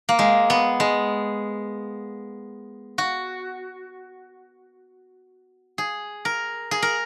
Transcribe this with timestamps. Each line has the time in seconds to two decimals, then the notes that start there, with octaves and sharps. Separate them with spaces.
0.09 A#3
0.19 G#3
0.50 B3
0.80 G#3
2.98 F#4
5.78 G#4
6.25 A#4
6.71 G#4
6.82 A#4